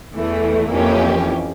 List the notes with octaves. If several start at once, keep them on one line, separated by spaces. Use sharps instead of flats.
E2 E3 A3
F2 E3 A#3 C#4 G4